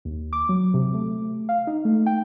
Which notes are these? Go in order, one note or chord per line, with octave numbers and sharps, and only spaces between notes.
D#2
D6
F#3
C3
A3
F5
D#4
A3
G5